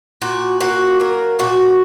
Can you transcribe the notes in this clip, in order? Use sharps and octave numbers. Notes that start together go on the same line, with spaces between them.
A#2 F#4
A#3 F#4
F#3 A#4
A#2 F#4